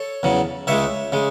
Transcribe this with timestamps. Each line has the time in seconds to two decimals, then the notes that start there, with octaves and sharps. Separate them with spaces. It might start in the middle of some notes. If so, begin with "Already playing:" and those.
Already playing: A4 C#5
0.23 E2 C#3 F#3
0.67 C#2 C#3 G#3 C#5 E5
1.12 C#3 G#3